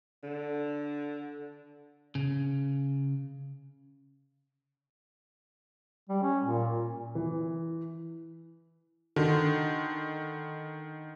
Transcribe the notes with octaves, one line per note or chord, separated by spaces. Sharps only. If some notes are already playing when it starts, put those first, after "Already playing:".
D3
C#3
G3
C#4
A#2
E3
D3 D#3